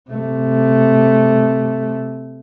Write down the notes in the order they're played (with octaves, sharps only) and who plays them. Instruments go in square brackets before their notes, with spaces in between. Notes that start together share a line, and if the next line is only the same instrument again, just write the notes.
[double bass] C3 A3